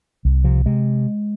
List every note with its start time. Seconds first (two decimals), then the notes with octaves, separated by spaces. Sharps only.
0.25 C2
0.44 C3 F3
0.66 C3 G#3